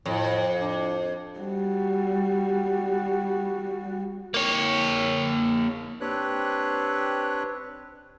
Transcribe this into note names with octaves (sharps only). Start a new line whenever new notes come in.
F2 A2
D4
G3 F#4
A#3 C#5
C4 D4 G4 B4 C#5 F#6